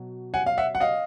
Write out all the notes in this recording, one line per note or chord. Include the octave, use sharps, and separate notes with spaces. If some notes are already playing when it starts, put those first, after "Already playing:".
Already playing: B2 F#3
F#5 G#5
F5
E5 F#5
F#5
D#5 F5